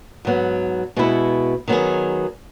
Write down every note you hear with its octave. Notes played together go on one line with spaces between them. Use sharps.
G#2 F#3 B3
B2 G#3 B3 E4
D#3 F#3 B3 D#4 G#4